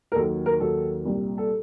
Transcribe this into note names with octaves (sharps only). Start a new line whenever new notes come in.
A#4
D#2 D#3 F#3 A4
A#4
D#2 D#3 F#3 A4
C2 A#2 G3
A4